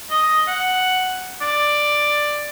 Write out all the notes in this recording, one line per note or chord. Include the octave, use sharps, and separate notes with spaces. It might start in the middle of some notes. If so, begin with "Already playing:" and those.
D#5
F#5
D5